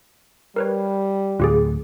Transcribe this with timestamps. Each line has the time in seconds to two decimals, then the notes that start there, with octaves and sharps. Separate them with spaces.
0.56 G3 A#4 B4 C#5
1.40 D2 A2 F4 G4 G#4